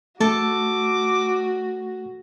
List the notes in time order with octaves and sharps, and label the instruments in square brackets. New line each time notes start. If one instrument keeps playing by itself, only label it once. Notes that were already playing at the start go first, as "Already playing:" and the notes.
[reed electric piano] A3 [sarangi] F#4 [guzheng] A4 [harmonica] D6